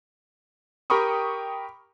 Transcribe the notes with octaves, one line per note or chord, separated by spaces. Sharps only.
G4 A#4 G5 B5 C#6 D#6